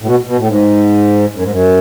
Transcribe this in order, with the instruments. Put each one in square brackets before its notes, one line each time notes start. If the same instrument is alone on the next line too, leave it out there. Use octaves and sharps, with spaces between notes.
[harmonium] A2
B2
B2
A2
G#2
F#2
G#2
F#2